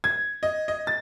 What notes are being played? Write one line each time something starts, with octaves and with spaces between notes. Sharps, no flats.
G#6
D#5
D#5
A6